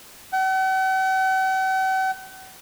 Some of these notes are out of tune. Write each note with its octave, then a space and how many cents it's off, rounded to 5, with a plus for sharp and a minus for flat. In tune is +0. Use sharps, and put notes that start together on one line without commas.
F#5 +45